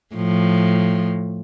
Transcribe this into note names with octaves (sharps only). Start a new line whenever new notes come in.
A2 F3